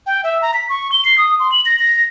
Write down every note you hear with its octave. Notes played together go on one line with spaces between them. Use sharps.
G5
E5
A#5
B6
C#6
G7
C7
D#6
C6
F#7
A#6
A#6